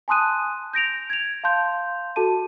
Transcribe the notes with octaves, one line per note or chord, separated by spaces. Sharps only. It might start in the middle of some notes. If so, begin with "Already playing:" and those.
G#5 A5 C6 D#6 F#6 D#7
G6 A#6 D7 F7
G#6 F7
F5 A5 C6 G6
F#4 A4 A5 D#7